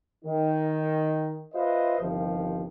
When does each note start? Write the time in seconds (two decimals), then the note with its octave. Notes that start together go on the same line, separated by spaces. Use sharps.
0.25 D#3
1.54 F4 B4 C5 D#5 E5
2.00 G1 C2 D#3 F3